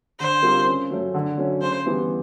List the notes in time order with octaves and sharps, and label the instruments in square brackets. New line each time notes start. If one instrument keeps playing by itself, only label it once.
[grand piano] D3 [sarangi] C5
[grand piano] G3 C4 F4 A#4
C#3
F#3 A3 C#4
D3
F#3 A3 C#4
[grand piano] C#3 [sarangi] C5
[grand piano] E3 G3 B3 E4